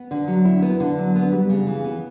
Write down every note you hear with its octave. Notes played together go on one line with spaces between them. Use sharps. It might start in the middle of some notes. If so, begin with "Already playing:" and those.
Already playing: B3
D3
F#3
E4
B3
D3
F#3
B3
G3
C#3
E3
B3